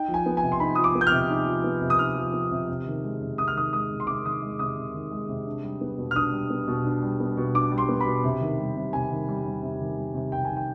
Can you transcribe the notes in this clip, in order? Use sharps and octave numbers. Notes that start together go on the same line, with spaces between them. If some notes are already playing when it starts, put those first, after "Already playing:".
Already playing: D#4 G5
F3
G#5
B3
G#5
C3
C6
D#4 B5
F3 D#6
D6
B3
G6
F6
C3
D#4
F3
B3
C3
D#6
D#4 F6
F3
B3
C3
C3
D#3
G#3
C3
C3 D#6
F6
D#3 D#6
G#3 D#6
C3
C6
C3 D6
D#3 D#6
G#3
C3 D#6
C3
D#3
G#3
C3
D4
G3
B3
B2
F6
D4 D#6
G3
B3
B2
D4
G3
B3
B2
D4 D6
G3
C6
B3
B5
B2
C3
D#3
G3
C3
C3 G#5
D#3
G3
C3
C3
D#3
G3
C3
C3 G5
D#3 G#5
G5